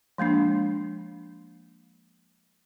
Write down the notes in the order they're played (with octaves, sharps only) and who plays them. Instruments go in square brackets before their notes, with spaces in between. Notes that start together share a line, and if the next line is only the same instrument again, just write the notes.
[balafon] F3 G#3 A#3 D4